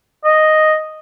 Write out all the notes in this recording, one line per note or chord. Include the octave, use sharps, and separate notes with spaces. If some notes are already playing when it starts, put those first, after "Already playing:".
D#5